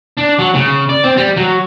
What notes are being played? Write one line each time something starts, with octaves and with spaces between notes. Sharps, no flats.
D4
F#3
C#3
D5
C4
G3
F#3